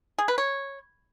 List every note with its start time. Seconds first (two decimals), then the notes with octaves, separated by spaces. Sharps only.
0.18 G#4
0.28 B4
0.38 C#5